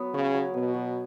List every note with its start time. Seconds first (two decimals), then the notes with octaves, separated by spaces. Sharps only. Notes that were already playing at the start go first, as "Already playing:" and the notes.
Already playing: F#3 B3
0.14 C#3 C#5
0.34 F#3
0.54 B2 B3
0.74 F#3